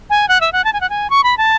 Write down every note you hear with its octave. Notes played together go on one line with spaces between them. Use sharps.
G#5
F#5
E5
F#5
A5
G#5
F#5
G#5
C#6
B5
A5